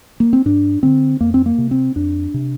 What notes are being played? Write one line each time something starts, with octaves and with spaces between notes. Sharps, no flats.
A#3
C4
G2 D4
D3 C4
F2 A#3
C4
A#3
C3
C4
F2 D4
C3